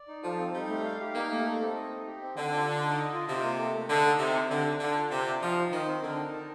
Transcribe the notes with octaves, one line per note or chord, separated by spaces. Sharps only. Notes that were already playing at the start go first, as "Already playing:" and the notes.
Already playing: D5
D#4
F3 A4
C4
G3 D#4
A3
F5
G4
A#3 D#4
A3
A4
C4
D#5
D#4
G4
C4
D3 D5
F4
D5
D#4
D#5
F4
C3 F4
A#3
A4
A3
D3 D#5
D#4
C3 C5
C4
D3 D5
D4
D3 F5
F4
C3 D5
F4
F3 D#5
D#4
D#3 C5
C4
D3 A#4
D#4
A5